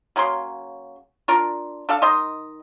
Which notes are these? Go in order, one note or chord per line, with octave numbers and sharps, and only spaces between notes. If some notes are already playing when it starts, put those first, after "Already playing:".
C#3 F#3 A#3 C6
D4 F4 A#4
D4 A4 F5
D#3 D#5 C6